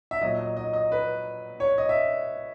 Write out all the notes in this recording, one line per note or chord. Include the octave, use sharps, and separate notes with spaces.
E5
A#2 F#3 D#5
D#5
D#5
D#5
B4
C#5
D#5
E5